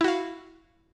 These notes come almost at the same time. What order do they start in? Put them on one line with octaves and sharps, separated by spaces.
E4 F#4 F5